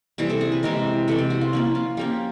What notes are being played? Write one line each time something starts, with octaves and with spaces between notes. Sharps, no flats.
C3 E3 G3 G#4
A4
G#4
B4
C3 E3 G#3 A#4
C3 E3 G#3 A4
G4
F#4
F4
F3 A#3 C#4 E4
F4
F3 A#3 C#4 G4